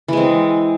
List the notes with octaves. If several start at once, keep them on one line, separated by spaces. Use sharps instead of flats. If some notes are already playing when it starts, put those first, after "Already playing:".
E3 G#3 C4